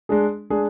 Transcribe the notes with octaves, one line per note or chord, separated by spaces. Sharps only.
G#3 D4 G#4
G#3 D4 G#4